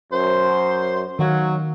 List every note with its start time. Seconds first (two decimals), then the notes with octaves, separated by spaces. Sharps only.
0.12 F#2 C5
1.19 D#3 F#3 F5